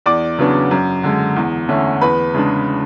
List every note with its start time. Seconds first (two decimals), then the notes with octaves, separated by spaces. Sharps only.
0.06 E2 D5 D6
0.39 C#3 F#3 B3 D4
0.71 F#2
1.04 D3 G#3
1.36 E2
1.69 D3 A3 C#4
2.01 E2 B4 B5
2.34 C#3 G#3 D4